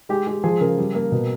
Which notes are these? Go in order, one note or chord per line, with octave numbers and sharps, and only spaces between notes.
G#3 G4
G#3 G4
F3 G#4
C#3 A#4
G3
A#3
B2